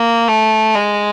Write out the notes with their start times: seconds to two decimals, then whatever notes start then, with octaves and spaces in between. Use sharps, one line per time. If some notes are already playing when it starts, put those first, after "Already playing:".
Already playing: A#3
0.28 A3
0.75 G#3